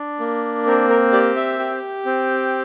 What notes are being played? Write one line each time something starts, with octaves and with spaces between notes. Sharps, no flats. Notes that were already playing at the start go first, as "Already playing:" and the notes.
Already playing: D4
A#3
C4 A#4
A#4
G4 D5
E5
G4
C4